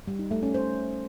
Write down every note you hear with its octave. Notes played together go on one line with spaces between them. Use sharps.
G3
D#4
A3
C#4
C5